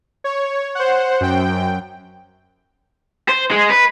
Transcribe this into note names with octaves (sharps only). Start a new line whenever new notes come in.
C#5
C5 F#5
F#2 G5
C5
G#3
B4